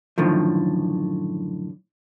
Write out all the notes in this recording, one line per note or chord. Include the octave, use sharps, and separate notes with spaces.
F#2 A2 D3 D#3 F3